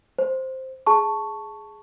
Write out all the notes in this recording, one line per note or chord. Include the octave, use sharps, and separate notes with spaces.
C5
G#4 A5 C#6